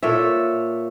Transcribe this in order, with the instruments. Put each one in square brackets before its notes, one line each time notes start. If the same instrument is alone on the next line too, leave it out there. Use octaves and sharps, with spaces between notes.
[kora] A#2 A4 C#5 E5